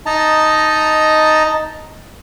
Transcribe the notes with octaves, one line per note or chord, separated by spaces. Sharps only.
D#4 D#5 A5 A#5